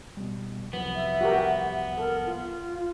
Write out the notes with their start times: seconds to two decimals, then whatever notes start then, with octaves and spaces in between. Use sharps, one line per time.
0.17 B2 G3
0.73 C2 F2 F#3 B3
0.95 E5
1.21 F#4 G4 A#4
1.98 A4 A#4
2.26 F4